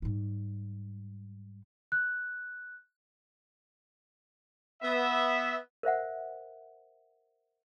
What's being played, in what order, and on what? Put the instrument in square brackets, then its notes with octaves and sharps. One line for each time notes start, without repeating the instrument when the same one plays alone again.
[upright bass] G#2 G3
[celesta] F#6
[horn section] B3 E5
[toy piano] A#4 C5 E5 F#5